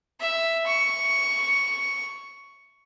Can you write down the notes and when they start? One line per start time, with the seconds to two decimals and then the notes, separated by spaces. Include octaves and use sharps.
0.21 E5
0.66 C#6